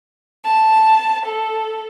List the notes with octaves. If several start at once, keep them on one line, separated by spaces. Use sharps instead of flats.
A5
A4